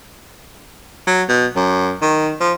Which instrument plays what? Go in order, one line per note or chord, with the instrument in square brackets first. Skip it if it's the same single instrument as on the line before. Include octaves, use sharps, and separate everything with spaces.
[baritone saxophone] F#3
B2
F#2
D#3
F3